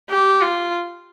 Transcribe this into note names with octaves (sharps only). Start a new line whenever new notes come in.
G4
F4